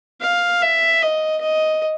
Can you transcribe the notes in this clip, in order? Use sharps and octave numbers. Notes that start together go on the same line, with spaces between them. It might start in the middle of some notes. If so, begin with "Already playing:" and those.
F5
E5
D#5
D#5